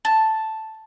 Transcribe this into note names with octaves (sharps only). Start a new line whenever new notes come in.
A5